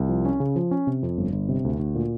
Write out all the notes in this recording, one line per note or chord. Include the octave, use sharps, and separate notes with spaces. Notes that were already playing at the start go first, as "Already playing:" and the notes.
Already playing: C2
F3
C#4
C#3
F3
C#4
C3
F2
G1
G1
C3
D2
D2
A#2